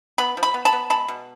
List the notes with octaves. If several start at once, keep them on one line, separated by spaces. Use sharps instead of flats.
B3 B5
F3
B5
B3
A5 B5
B3
G#3 A5 B5
B2